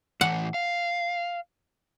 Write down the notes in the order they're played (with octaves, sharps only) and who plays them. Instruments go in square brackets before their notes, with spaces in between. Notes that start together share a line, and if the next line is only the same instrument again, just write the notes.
[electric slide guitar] A2 E3 [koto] F#5
[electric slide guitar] F5